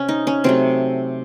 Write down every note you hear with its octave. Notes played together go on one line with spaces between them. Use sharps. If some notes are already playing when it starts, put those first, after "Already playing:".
Already playing: C3 C#4
D#4
C#4
C3 F#3 A3 C4